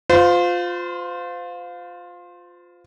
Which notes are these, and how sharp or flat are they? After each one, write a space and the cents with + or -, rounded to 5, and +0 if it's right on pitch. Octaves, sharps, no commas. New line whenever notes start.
F4 +15 C5 -35